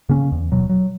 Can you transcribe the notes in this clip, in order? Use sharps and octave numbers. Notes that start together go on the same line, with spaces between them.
C#3 A#3 C#4
E2
D#1 B2 F#3
F#3